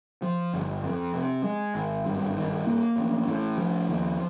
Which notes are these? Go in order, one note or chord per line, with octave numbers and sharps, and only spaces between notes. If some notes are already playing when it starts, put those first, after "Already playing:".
F3
G1
F2
C3
G#3
G#1
G2
D#3
A#3
A1
A2
F3
D#2